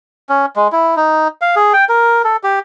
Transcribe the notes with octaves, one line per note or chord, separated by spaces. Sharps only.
C#4
G#3
E4
D#4
F5
G#4
G5
A#4
A4
G4